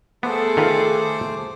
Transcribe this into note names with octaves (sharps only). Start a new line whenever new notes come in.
A3 B3 G#4 A4 C5 D6
D#3 F4 B4